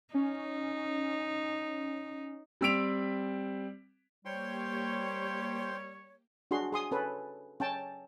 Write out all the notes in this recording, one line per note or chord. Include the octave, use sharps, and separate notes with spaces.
C#4 D#4
G3 C4 E6 B6 D7 F7
G3 A#3 G4 C5 C#5 G5 C6
D4 F#4 G#4 C6
G#4 C6 D#6
C#4 A4 B4
C#4 G5 A5